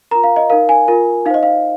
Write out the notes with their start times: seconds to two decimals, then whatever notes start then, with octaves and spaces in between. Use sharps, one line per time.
0.11 F4 A#4 A#5
0.24 F5
0.36 D#5
0.50 D#4 A#4 F5
0.69 G#5
0.88 F4 A#4
1.26 D#4 F5
1.30 C5 D#5
1.43 F5